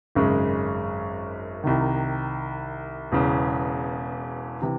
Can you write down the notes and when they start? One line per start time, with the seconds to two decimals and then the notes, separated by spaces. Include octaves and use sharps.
0.15 G#1 F#2 C#3 G#3
1.64 C2 C3 D#3
3.12 E1 E2 C#3
4.62 C3 E3